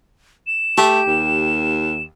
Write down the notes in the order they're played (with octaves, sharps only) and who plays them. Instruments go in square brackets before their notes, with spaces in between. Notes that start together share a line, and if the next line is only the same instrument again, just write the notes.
[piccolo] E7
[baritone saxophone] A3 [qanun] G4
[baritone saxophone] D#2